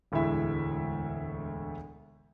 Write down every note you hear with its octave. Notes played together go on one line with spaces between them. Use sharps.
E1 D2 A2 G#3 E5